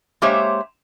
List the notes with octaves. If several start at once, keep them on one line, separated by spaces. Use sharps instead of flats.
G#3 A#3 G4 C5 C#5 E5